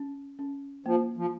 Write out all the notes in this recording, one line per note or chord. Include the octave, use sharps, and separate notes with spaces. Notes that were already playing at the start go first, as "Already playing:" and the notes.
Already playing: C#4
C#4
F3 A#3
F3